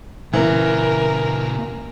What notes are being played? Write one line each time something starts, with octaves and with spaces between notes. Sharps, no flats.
A#2 C#3 E3 A#4